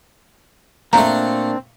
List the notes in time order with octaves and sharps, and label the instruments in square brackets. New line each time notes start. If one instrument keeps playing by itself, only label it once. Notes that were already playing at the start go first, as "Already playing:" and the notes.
[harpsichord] A#2 A3 [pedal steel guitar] A#3 D4 [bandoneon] C4 [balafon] A#5